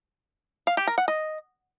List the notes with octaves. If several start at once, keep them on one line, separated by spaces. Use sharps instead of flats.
F5
G4
A#4
F#5
D#5